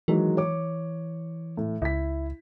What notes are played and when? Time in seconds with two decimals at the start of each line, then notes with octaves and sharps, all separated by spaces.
0.08 D#3 E3 F#3 G#3
0.37 C#5 D6
1.57 A2
1.82 C#2 E4 B6